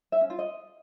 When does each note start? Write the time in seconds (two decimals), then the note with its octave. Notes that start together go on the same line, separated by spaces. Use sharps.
0.12 E5
0.21 C#4
0.30 F4
0.39 D#5